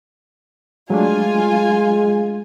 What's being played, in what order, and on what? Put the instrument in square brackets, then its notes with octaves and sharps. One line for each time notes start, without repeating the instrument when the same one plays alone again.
[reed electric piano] F#3 A3 D4 [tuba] G#3 [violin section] F4 G#5